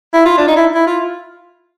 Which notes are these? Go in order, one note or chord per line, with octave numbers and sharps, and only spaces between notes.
E4
F4
D4
D#4
E4
E4
F4